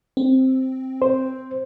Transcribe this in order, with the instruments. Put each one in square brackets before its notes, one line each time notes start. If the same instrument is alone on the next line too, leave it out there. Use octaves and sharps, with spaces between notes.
[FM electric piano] C4
[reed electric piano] C5